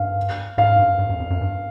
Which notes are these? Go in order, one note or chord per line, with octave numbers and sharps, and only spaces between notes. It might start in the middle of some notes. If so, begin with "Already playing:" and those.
Already playing: G2 F5
G#2 F5
G2
G2
F#2
F2
F#2
G2